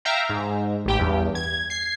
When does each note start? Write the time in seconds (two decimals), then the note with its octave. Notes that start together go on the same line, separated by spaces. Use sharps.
0.05 E5 F5 G5 A#5
0.29 G#2
0.86 A1 G4 G5
1.00 E2 G2
1.35 G#6
1.70 G#6 C7